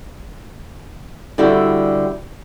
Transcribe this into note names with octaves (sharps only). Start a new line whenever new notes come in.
D3 G3 E4 F#4 G4